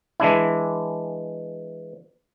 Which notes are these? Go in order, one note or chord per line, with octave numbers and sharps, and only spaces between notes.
E3 G#3 D4 E4